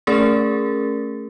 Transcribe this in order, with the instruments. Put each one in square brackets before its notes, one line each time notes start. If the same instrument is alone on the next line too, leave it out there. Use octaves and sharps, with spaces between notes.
[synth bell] A3 C#4 G#4 A#4 A6